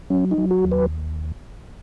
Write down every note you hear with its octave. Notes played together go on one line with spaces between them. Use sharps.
F#3 C#4
D#4
F#3
F#4
D#2
B4